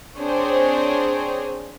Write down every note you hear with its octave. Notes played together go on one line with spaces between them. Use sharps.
C4 D4 G#4 C5 C#5